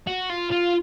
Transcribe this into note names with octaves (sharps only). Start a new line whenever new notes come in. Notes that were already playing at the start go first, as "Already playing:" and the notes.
F#4
F4
F4